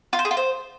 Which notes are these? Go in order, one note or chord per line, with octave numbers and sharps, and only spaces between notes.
F4
C5
G#4
F4
C5